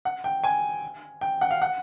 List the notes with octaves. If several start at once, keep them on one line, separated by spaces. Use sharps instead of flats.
F#5
G5
G#5
G5
F#5
F5
F#5